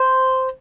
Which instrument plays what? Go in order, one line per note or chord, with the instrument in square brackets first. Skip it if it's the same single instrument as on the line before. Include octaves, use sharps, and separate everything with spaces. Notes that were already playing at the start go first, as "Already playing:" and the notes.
Already playing: [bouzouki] C5